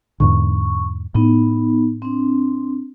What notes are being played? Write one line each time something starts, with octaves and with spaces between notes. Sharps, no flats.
E2 G#2 D3 C#6
A2 B3 D#4
C4 D4